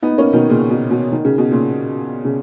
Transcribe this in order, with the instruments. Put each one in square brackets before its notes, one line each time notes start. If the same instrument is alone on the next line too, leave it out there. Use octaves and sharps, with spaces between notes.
[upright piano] B3 D#4
A#3 C#4
B2 D#3
A#2 C#3
B2
B2
D#3
C#3
B2
A#2 C#3
C#3